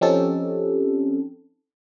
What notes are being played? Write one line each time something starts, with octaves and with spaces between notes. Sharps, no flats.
F3 C4 C#4 D#4 G4 A4